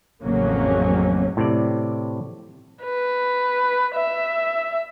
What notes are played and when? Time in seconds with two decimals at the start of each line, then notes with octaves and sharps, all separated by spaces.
0.23 A1 F2 C#3 F#3 A#3 C#4
1.37 A2 C3 D5
2.84 B4
3.95 E5